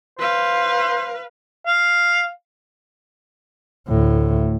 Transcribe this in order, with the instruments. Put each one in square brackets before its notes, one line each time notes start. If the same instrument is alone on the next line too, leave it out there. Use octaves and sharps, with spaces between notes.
[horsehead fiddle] B4 F5 [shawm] C5
[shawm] F5
[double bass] D2 A2